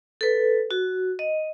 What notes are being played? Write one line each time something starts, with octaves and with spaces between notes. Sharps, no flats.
A4 B4
F#4
D#5